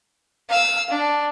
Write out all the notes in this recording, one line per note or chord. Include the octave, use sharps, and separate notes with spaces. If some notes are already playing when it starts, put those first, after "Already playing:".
F5 E6
D4